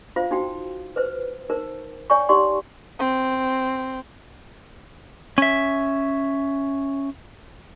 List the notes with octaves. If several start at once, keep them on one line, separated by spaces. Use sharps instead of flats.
F4 C5 F5
D#4 F#4 G5
B4 C5
D#4 A#4 C5
C#5 D5 G5 G#5 C#6
D#4 G4 D5 F#5 C6 C#6
C4
C#4 E5